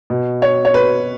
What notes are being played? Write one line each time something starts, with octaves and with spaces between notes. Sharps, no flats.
B2
C#5
C#5
B4